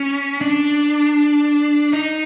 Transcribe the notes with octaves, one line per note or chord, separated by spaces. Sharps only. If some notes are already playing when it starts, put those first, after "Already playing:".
Already playing: C#4
D4
D#4